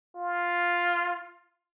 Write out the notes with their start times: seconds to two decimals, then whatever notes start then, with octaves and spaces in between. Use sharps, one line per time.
0.16 F4